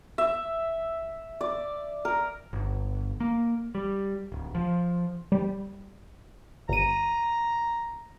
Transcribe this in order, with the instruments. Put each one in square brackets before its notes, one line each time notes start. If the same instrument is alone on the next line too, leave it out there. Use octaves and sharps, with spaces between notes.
[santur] E5
D5
A#4
[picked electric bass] G1
A#3
G3
D1
F3
[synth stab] G3
[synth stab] G1 D#7 [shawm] A#5